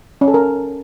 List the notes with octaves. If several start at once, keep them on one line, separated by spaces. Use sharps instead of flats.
C#4
A4
A#4